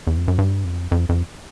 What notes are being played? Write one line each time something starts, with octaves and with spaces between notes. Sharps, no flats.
E2
F2
F#2
G2
F2
F2
F2